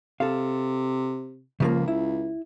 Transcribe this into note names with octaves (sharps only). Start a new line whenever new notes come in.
C3 A4 F5
C#2 C#3 F3 A#3
E4